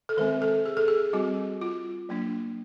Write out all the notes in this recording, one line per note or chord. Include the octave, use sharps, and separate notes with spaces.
A4
D#3 G#3 C4 A#4
A4
G#4
A4
G#4
G3 C4 F#4
F4
F#3 A#3 D4